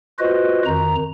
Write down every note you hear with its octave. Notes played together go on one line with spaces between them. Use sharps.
F4 F#4 B4 C5 D#5
F2 D#3 A#5